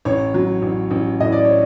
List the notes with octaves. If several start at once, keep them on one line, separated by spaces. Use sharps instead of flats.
A1 C#5
F#3
A1
A1
A2 D#5
D5
C#5